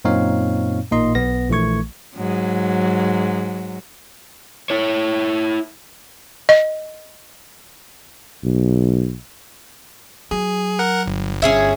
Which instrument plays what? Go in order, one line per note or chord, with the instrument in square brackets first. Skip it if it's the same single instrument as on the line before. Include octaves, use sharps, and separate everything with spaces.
[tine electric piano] F#2 A#2 C4 D#4 C#5 F5
A1 A#2 A#3 D#4 D#5 C6
B1 B3 A#6
A#1 E3 A3 C#6 G#6
[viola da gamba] G#2 F#3
[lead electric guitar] E4 C#5
[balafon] D#5
[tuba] B1
[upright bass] F#3 [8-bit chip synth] G#4
[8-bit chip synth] A#4 F#5
G1
[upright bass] G2 [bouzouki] C#4 G#4 E5